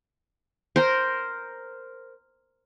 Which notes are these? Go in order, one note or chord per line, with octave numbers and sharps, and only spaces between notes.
A#4 C5